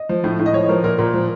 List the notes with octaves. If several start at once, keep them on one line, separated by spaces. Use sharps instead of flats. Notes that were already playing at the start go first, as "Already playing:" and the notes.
Already playing: D#5
F3
A2
A2
D#5
F3 C#5
F3 A#4
A#2 A#4
A#2
F3